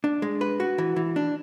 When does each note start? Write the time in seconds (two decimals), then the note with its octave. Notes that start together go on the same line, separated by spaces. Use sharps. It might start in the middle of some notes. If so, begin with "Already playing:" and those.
0.04 D4
0.22 G#3
0.41 B4
0.60 F#4
0.78 E3
0.96 E3
1.16 D4